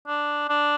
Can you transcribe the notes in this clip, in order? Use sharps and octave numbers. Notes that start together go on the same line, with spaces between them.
D4
D4